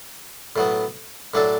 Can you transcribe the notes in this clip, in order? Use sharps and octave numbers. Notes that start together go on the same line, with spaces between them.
A2 F#3 B3
A2 F#3 D4 A4